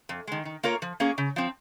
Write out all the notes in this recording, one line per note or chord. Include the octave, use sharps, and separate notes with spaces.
F2
D#3 G#3
D#3
A#3 F4 A#4 C#5
F3
A#3 C#4 G#4
C#3
F3 C4